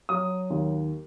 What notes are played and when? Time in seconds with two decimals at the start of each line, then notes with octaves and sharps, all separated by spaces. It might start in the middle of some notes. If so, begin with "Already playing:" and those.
0.09 F#3 D#6
0.50 D#2